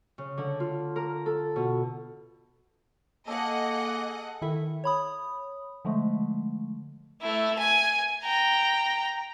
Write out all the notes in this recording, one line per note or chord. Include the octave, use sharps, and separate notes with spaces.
C#3
D3
F4
A#4
A4
B2
A#3 G#4 A4 D#5 F#5
D#3 E4 A4 E5
C#5 B5 D#6
D3 F3 G#3 A3
A3 E4
G#5
G5 A#5